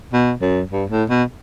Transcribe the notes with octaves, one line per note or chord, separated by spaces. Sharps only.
B2
F#2
G2
A2
B2